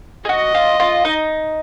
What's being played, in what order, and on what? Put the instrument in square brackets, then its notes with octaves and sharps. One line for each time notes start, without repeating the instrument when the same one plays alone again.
[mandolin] G#4
[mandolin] F#4 [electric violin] D#5
[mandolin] F4
F4
D#4